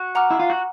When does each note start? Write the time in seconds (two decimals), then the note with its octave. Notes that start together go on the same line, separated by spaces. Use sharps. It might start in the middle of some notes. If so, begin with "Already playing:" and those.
Already playing: F#4
0.15 F#5 A#5 D6 F6
0.31 E4
0.40 F4
0.50 F#4